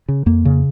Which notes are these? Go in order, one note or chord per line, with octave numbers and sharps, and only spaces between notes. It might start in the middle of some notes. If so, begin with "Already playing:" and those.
C#3
F2 A#3
C#3